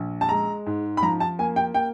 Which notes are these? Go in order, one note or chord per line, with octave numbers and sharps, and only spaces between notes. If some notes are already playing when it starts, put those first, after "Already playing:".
Already playing: A#1
A5
G#3 A#5
G#2
B5
F3 A#5
A5
A#3 G#5
G5
A#3 G5